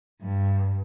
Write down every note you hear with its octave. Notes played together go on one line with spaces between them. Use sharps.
G2